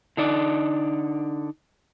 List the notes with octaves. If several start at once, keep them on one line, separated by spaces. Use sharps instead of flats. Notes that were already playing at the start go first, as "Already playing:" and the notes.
D3 D#4 D5